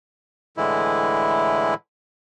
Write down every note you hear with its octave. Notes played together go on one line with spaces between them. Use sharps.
A2 D3 E3 G#3 E4